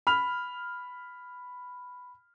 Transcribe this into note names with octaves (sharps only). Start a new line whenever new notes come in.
B5 F6 F7